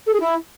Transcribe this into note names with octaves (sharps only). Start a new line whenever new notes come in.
A4
G#4
E4